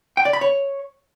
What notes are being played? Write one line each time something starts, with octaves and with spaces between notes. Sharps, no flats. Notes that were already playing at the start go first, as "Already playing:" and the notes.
G5
D5
B5
C#5